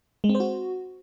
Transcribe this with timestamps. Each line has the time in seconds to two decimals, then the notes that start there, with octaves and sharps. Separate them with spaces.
0.24 G#3
0.29 C4
0.35 C5
0.40 F#4